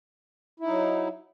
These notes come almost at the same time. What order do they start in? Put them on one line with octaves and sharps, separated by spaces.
E4 D#4 F#3